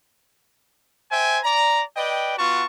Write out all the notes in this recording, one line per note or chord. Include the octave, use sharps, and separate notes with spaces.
C5 E5 G5 G#5
D5 A#5
B4 D5 D#5 G5
B3 F4 F#4 A5 C#6